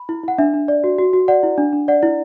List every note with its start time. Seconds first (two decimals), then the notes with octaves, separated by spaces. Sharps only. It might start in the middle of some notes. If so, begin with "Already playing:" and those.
Already playing: B5
0.09 E4
0.24 E4 F#5
0.38 D4 E5
0.54 D4
0.68 D5
0.84 F#4
0.98 F#4
1.13 F#4
1.28 D5 F#5
1.43 E4
1.58 D4
1.73 D4
1.88 D5 F#5
2.03 E4